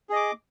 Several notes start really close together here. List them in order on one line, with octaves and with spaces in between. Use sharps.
G#4 D#5 D6